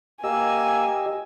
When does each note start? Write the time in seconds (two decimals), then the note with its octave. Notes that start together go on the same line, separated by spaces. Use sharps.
0.24 A#3 G4 D#5 G#5 E6